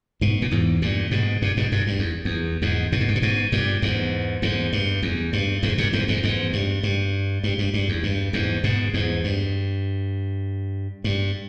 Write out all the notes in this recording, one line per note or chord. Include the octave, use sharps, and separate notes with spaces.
G#2 B2
A#2
E2 G#2
G2 A#2
G#2 B2
G2 A#2
G#2 B2
G2 A#2
G2
E2
E2
E2 G#2
G#2 B2
G2
G#2
A#2
G#2 B2
G2 A#2
E2 G#2
E2 G#2
G2
E2
G2
E2 G#2
G2 A#2
E2 G#2
E2 G#2
E2 G#2
G2
G2
G2
G2
G2
E2
G2
E2 G#2
G#2 B2
E2 G#2
G2
G2